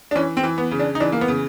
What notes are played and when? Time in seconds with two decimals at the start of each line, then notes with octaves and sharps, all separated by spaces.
0.11 D4
0.15 E3 C#4
0.37 C4
0.44 E3
0.58 B3
0.71 C#3
0.79 D4
0.95 D#4
1.00 E3 D4
1.12 A#3
1.21 B3
1.28 C#3